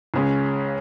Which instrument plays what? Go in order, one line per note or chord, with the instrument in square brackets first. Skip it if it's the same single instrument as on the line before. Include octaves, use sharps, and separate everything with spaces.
[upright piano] C#2 C#3 G#3 C#4